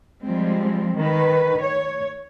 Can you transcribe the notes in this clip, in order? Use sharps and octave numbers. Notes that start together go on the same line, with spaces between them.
F3 G3 G#3 C4
D#3 B4
C#5